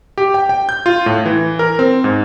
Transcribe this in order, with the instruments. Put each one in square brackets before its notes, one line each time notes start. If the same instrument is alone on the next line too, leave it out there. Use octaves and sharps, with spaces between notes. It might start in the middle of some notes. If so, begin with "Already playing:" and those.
[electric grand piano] G4
G5
G5
G6
F4
A2
E3
A#4
C4
G#2